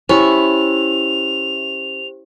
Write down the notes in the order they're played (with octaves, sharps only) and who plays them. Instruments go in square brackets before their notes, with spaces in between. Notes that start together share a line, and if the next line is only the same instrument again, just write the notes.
[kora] C#4 [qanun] E4 [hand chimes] G4 C5 [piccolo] F7